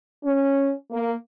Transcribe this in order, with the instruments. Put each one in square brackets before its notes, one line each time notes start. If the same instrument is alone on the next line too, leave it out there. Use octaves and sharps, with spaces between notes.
[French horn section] C#4
A#3